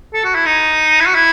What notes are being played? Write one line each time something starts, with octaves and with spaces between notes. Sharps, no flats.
A4
F#4
E4
D#4
E4
F#4
E4